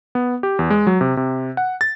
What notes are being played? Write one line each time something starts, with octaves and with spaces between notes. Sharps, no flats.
B3
G4
E2
G#3
F#3
C3
C3
F#5
A6